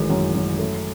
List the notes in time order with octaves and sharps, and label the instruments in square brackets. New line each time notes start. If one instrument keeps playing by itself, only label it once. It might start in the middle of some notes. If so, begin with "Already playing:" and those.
Already playing: [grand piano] A1 D#3 F#3 G#3
F#2
F#2
A3